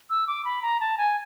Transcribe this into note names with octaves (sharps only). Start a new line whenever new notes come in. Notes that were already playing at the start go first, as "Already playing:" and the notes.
E6
D6
B5
A#5
A5
G#5